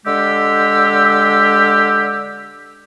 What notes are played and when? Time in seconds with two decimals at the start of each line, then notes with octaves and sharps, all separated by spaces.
0.05 D3 G#3 G4 E6